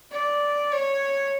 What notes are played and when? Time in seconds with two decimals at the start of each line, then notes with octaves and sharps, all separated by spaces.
0.12 D5
0.72 C#5